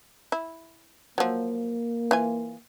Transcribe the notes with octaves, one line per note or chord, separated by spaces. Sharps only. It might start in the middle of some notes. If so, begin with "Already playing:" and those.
E4
F3 F#3 A#3
E3 F4 G#5